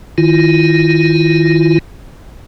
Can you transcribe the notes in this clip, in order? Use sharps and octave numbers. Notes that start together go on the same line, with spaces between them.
D#3 E4 F4